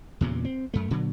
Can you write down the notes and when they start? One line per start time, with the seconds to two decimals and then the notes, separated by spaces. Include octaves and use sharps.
0.21 E2 G2 A#2 C#3
0.45 C4
0.74 F#2 A3
0.91 A#2 D3 F#3